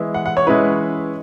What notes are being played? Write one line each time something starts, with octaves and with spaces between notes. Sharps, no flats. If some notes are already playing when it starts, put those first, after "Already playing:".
Already playing: E3 G#3 B3 E4
F#5
F#5
C#5
E3 G#3 C#4 E4 B4